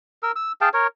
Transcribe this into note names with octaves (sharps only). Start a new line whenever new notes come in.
A#4 E6
E6
G#4 F5 G5 A5
A#4 C#5